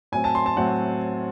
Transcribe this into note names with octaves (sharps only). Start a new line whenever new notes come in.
A2 F#3 C4 G#5
A5
C6
A5
A2 F#3 C4 F#5